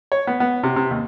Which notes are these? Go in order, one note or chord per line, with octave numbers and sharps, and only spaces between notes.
C#5
B3
B3
C3
C3
D#2